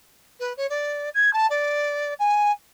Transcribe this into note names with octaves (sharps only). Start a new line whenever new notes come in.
B4
C#5
D5
G#6
A5
D5
G#5